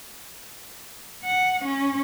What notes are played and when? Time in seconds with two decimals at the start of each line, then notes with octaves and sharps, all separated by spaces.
1.24 F#5
1.65 C#4